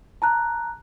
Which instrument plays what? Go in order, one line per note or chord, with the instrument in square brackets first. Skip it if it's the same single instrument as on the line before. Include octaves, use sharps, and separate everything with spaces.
[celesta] A5 A#5 F#6